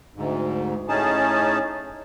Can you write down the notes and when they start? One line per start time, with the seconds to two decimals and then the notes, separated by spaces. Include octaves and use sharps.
0.16 D2 G#2
0.89 A2 C#4 D#4 G#4 A5